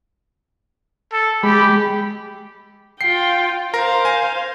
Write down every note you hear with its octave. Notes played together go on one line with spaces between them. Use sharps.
A4
G#3 G4 B5
F4 G5 C7
A#4 C5 F5 A#6
G#5